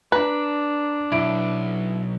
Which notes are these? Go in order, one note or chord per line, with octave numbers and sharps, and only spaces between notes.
D4 B4 A#5
B1 E4 D7